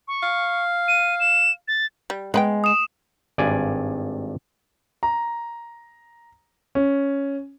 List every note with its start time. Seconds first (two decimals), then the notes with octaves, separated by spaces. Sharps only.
0.08 C#6
0.23 F5
0.88 D#7
1.20 E7
1.68 A6
2.10 G3
2.34 G#3 B3 B4 G5
2.64 D#6 E7
3.38 G#1 G2 D5 G#5
5.03 A#5
6.75 C#4